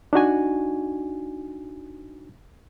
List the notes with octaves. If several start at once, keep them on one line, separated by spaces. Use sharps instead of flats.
D4 D#4 F#4 G#5